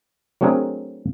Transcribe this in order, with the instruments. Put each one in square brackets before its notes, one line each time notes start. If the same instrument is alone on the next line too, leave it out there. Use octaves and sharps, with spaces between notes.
[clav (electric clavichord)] F#3 A3 C4 D4 G#4 A#4